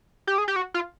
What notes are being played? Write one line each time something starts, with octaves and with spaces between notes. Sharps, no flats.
G4
G#4
G4
F#4
F4